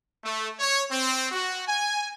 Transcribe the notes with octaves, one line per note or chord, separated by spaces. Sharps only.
A3
C#5
C4
F#4
G#5